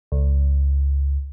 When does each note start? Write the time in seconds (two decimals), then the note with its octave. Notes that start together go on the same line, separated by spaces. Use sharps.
0.12 C#2